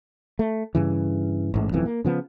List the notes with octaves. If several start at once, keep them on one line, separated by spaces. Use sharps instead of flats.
A3
G2 C#3 E3
A1 G#2
D1 B1 F2 E3
A#3
C#3 F3 B3